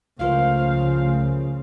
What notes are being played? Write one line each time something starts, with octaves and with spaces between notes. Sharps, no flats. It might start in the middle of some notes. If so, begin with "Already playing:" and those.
C#2 C#3 F3 A3 F4 A#4 C5 F5